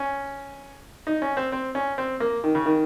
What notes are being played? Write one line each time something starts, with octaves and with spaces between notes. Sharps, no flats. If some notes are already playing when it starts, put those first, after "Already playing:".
Already playing: C#4
D#4
C#4
C4
C4
C#4
C4
A#3
D#3
C#3
D#3